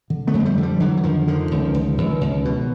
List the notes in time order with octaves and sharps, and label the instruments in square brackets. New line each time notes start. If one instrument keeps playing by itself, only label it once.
[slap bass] D3
A3 B3
F2
G#3
G3 A3
D3
F3 G3
D3 E3 F#3
E3
F2 D#3 F3
D3 D#3 F3
C#2
C#2
C#2
C#2
B2